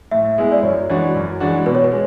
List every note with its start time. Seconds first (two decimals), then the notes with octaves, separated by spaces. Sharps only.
0.11 A2 E5
0.38 G#3 B3 E4 G#4
0.52 D5
0.63 F#2 C#5
0.89 E3 G#3 D4 F#4
1.15 F#2
1.40 E3 G#3 D4 F#4
1.66 B2 B4
1.75 C#5
1.84 B4
1.91 G#3